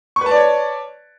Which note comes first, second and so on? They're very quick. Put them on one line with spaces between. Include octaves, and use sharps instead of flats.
C#6 B4 A5 D5 C#5